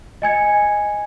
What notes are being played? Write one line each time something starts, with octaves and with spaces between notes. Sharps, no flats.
D#5 G#5 G#6 C#7